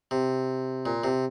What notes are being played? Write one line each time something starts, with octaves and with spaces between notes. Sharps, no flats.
C3
A#2
C3